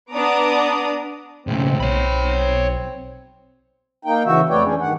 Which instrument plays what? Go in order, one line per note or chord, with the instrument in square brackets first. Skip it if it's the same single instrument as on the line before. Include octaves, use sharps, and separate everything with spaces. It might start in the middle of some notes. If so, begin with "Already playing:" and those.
[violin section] B3 D4 A#5 D6 D#6
[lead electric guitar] B1 A2 [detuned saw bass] C#3 [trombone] C4
[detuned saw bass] B1 [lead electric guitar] C#5 B5
[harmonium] A#3 D#4 G5
C#3 E3 F#4 E5
F2 A3 B4 C#5 D5 G5
E3 C#4 D4 G#4
G2 D#3 F#5